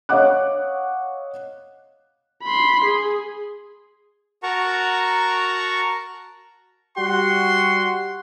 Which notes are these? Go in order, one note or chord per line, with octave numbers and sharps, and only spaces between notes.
C#5 D#5 F5 F#5 D6 F#6
B5 C6
G#4
F#4 A#4 F#5 A5 A#5 C#6
G3 F#4 F#5 C6